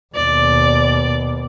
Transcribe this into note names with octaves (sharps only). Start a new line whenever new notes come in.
D#2 B2 D5